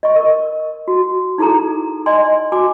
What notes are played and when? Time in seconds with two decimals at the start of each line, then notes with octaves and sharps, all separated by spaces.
0.03 D#5 C#6
0.16 A#4
0.88 F#4
1.38 D#4 E4 G#4 A4 A#5
2.06 D5 D#5 G#5 C6
2.52 F#4 G#5 D6